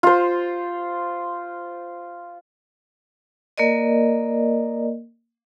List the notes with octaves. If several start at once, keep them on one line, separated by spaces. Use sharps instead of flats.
F4 C5
A#3 A#4 D5 D#5